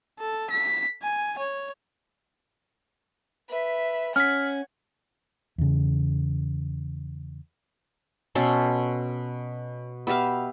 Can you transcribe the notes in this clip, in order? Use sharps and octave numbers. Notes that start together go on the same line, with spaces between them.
A4
B6
G#5
C#5
B4 E5
C#4 F#5 F6 G#6 B6
E2 C#3
B2 C#4 A4 C6
B3 G4 E5 F5